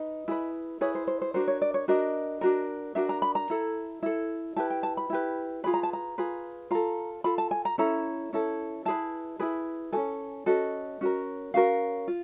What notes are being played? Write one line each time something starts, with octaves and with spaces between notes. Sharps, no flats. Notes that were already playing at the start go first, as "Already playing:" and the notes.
Already playing: D#4 B4 D#5
E4 G#4 B4
E4 G#4 B4 C#5
C5
C5
C5
D4 F#4 A#4 C5
C#5
D5
C#5
D4 F#4 A#4 D#5
D4 F#4 A#4
D4 F#4 A#4 E5
A#5
B5
A#5
E4 A4
E4 A4
E4 G4 B4 A5
G5
A5
B5
E4 G4 B4
F4 G#4 B4 B5
A#5
A5
A#5
F4 G#4 B4
F4 A4 A#5
F4 A4 B5
A5
G#5
A#5
C#4 E4 A4 A#5
C#4 E4 A4
E4 G#4 B4 A5
E4 G#4 B4
C#4 F#4 A4 G#5
C#4 F#4 A4 D#5
C#4 F#4 A#4
C#4 F#4 A#4 F5
F4